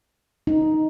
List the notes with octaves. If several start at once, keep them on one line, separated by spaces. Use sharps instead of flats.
D#4